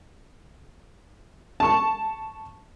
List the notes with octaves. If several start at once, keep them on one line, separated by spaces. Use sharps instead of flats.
A5 C#6